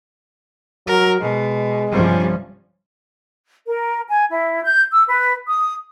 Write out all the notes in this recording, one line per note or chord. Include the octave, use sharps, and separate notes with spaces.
F#3 A#4
B2 G#3
G2 C3 F3 G3 C#4
A#4
G#5
E4
G6
E6
B4
D#6